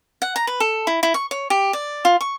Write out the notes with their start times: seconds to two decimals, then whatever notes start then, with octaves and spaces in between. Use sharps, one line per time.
0.22 F#5
0.36 A#5
0.47 B4
0.60 A4
0.87 E4
1.03 E4
1.14 C#6
1.31 C#5
1.50 G4
1.73 D5
2.05 F4
2.21 C#6